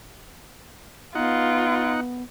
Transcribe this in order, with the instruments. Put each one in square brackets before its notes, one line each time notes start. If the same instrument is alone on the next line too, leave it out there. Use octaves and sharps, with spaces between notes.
[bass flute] B3 [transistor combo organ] D#4 F#5 [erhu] F4